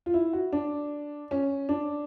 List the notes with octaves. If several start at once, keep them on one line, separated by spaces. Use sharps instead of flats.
F4
E4
F#4
D4
C#4
D4